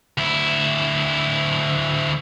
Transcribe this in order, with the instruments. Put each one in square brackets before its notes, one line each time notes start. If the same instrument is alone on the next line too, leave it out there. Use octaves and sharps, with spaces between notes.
[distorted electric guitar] D2 E4